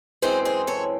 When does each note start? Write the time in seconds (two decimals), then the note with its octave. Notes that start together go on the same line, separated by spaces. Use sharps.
0.22 F#2 E3 G#3 C4 G#4 C5
0.45 G#4 C5
0.67 A4 C#5